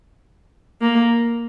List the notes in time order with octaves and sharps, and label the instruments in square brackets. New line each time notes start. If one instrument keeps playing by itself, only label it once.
[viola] A#3